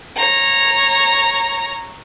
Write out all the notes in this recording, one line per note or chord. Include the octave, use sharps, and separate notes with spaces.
C#5 A#5